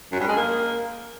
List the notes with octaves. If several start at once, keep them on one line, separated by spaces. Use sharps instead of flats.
F#2
G2
G#3
A#3